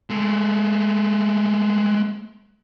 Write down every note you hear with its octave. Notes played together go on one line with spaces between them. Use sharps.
G#3 A3